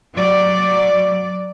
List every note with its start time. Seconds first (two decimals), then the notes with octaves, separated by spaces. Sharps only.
0.14 F#3 D5